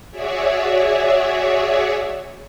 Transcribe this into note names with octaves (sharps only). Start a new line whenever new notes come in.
F#4 G#4 C#5 D5 E5